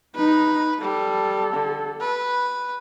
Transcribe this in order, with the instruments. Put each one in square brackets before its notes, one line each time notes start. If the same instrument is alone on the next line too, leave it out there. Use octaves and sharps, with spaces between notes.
[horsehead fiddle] D#4 A#5 [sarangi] B4
[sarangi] G3 [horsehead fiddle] A4
[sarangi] D3
B4